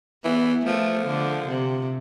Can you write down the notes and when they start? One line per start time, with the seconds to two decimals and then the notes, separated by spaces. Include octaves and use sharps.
0.24 E3 B3
0.66 F3 A3
1.07 D3
1.49 C3